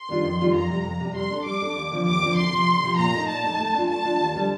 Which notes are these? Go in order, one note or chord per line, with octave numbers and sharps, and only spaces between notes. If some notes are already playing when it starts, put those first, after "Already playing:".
Already playing: C6
D#3 G3 D4 F4
F2
D#3 G3 D4 F4
F2 A#5
C3 G3
F2
C3 G3
G3 C6
D4 A4
G3 D6
D4 A4
D#2
D3 F3 C4
D#2 D6
D3 F3 C4
D2 C6
C3 F3
D2
C3 F3
A#2 A#5
A3 D#4
A#2 A5
A3 D#4
A3
D4 F4
A3 A5
D4 F4
D#2
D3 G3 C4